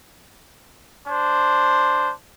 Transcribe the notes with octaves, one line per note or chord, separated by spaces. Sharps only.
D4 C5